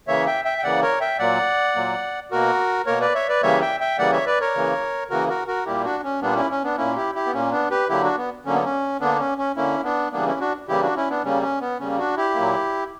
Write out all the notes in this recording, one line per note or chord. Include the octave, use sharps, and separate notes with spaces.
C#3 E3 A#3 C#5 E5
E5 G5
E5 G5
G5
C#3 E3 A#3 D5 F#5
A#4 C#5
E5 G5
A#2 F#3 A#3 D5 F#5
A#2 F#3 A#3
B2 A#3 F#4 A#4
B2 A#3 A#4 C#5
B4 D5
C#5 E5
B4 D5
C#3 E3 G3 A#3 C#5 E5
E5 G5
E5 G5
C#3 E3 G3 A#3 D5 F#5
C#5 E5
B4 D5
A#4 C#5
C#3 E3 A#3
C#3 E3 A#3 F#4 A#4
F#4 A#4
F#4 A#4
A#2 G3 A#3 E4 G4
D4 F#4
C#4
A#2 G3 A#3 B3 D4
C#4 E4
C#4
B3 D4
A#2 A#3 C#4 E4
E4 G4
E4 G4
B3
A#2 A#3 C#4
B3 D4
G4 B4
D3 F#3 A#3 E4 G4
D4 F#4
B3
D3 F#3 A#3 C#4
B3
C#4
D3 A#3 B3 D4
C#4
C#4
D3 A#3 C#4 E4
B3 D4
C#3 E3 G3 A#3 B3 D4
C#4 E4
D4 F#4
C#3 E3 G3 A#3 E4 G4
D4 F#4
C#4 E4
B3 D4
C#3 G3 A#3 C#4
C#4
B3
C#3 G3 A#3 C#4
D4 F#4
E4 G4
A#2 F#3 A#3